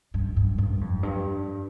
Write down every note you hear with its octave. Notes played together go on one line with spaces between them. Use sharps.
G2
G2
G2
F2
G2